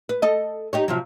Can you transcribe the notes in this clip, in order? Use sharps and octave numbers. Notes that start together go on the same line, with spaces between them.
B4
A4 D#5
D#4 G4 C#5
C3 F3 F#3